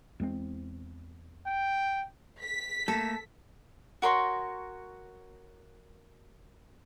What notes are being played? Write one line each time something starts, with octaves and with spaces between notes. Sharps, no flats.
E2 G#3 C4
G5
B6
A3 A#3 A4
F#4 A#4 C#5 C6